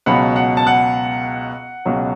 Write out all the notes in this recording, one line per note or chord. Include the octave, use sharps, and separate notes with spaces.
C#2 B2 F#3 F#5 B5
F#5
A5
F#5
C#2 B2 F#3